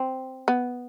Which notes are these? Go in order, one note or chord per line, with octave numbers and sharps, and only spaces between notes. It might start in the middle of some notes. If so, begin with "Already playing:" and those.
Already playing: C4
B3